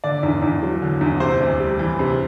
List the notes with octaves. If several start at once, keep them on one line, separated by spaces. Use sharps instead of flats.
D3 D5
E2
E2
F#3
D3
E2
C3 C5
D2
G3
E3
C3